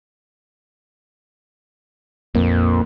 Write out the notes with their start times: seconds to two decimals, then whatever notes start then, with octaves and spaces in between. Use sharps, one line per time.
2.35 A#1 F2 A#3